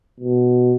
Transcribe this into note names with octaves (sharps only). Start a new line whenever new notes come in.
B2